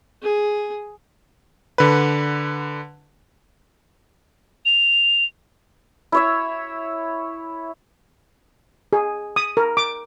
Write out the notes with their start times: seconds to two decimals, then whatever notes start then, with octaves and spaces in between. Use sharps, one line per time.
0.22 G#4
1.78 D3 B4
4.65 F7
6.12 E4 C#5 E5
8.93 G#4
9.36 D#6
9.57 A#4
9.77 D6